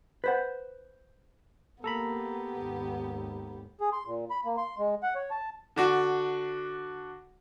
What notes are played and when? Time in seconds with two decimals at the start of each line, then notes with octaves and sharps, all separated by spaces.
0.24 B4 C5 F#5
1.84 A#3 B3 G4 A4 A#5 B5
2.54 G#1 D#2
3.81 G#4
3.93 C6
4.07 A#2
4.31 B5
4.45 A#3
4.58 C6
4.78 G#3
5.03 F#5
5.15 C#5
5.31 A5
5.76 D3 D4 F#4